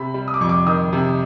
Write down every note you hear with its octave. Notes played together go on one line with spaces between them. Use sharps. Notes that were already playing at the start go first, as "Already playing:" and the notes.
Already playing: C3 B5
G3
D#6
D6
F2 C#6
D6
D#3 D#6
C3